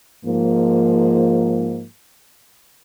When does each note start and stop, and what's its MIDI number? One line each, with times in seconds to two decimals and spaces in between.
0.25 1.84 44
0.25 1.84 53
0.25 1.84 58